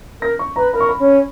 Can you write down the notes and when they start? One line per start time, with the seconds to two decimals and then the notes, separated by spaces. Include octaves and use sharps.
0.22 A#4 A#6
0.39 C#6
0.56 B4 A#5
0.73 A#4 B5
0.80 C#6
0.89 B5
0.99 C#4